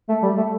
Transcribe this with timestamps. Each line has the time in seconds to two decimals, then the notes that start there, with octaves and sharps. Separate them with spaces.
0.09 A3
0.23 G3
0.37 A3